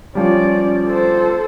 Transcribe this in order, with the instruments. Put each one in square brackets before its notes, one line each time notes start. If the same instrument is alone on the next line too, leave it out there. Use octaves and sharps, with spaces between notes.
[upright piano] F3 G3 [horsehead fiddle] C#4 D5
[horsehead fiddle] A4 C5